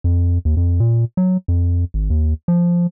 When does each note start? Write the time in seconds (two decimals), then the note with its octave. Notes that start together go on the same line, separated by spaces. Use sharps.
0.04 F2
0.45 D#2
0.57 F2
0.80 A#2
1.17 F#3
1.48 F2
1.94 G#1
2.10 D#2
2.48 F3